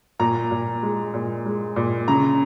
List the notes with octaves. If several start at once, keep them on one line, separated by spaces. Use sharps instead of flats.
A#2 A#5
A#2
G#3
A#2
G#3
A#2
C#3 A#5